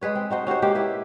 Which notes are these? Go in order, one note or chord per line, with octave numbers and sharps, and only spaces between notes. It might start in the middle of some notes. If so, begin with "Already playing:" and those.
G#3 G#4 B4 C#5
C4
D#4 F#4 C5
C#4 F#4 G4 C5
G#3 A#3 G4 C5
E4 G4 B4